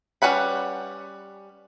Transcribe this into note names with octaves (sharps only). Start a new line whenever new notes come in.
G3 C#4 B4 F#5 B5